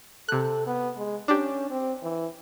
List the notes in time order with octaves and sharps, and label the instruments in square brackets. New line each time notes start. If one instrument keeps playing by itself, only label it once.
[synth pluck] C3 F#6 [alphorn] A4
[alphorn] B3
G#3
[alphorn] C#4 [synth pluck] D4 G4
[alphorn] C4
E3